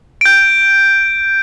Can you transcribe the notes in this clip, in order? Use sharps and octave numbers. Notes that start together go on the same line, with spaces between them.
G6 D7